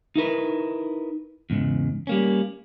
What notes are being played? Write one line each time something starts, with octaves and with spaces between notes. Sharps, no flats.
D#4 E4 A#4 B4
E2 G#2 C#3
G3 A#3 C#4